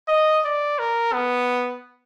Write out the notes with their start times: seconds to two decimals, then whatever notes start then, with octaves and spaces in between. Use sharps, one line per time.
0.08 D#5
0.44 D5
0.79 A#4
1.13 B3